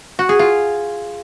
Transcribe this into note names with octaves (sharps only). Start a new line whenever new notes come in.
F#4
G#4
F4